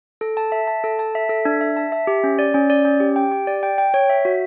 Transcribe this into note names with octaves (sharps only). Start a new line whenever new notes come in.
A4
A5
E5
A5
A4
A5
E5
A4
D4
E5
A5
E5
G4
C#4
D5
C#4
D5
C#4
G4
G5
G4
D5
G5
G5
C#5
E5
F#4